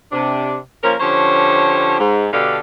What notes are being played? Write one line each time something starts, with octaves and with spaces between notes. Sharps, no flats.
C3 D4
F3 A#3 C#4 A#4
D3 F3 C#4 G4 C5 C#5
G#2
B2 D3 D4 G4 A4 F5